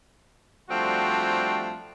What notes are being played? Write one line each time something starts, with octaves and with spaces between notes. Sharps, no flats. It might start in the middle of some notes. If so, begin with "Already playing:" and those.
F3 G3 A3 C4 D4 F#4